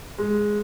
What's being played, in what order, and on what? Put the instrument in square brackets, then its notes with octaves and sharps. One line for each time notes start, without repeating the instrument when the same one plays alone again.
[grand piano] G#3